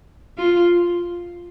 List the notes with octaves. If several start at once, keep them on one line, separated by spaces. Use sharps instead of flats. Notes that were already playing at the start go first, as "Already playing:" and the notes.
F4